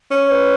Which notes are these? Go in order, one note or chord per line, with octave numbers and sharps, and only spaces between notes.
C#4
C#5
B4